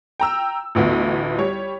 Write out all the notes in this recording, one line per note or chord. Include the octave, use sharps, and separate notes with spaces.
G5 A#5 E6
A1 D2 B3 F4
G3 C#5